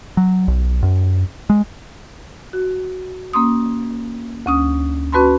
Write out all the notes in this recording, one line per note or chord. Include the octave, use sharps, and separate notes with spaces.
F#3
B1
F#2
G#3
F#4
A#3 C#4 C6 D#6
D2 C#4 D#6
C#4 F#4 B4 A5 B5 C6